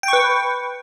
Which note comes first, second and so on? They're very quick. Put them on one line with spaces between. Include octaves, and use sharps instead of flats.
G5 C#6 B4